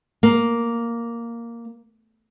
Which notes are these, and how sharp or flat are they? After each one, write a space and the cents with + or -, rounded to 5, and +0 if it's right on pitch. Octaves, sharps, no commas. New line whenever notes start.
A#3 +0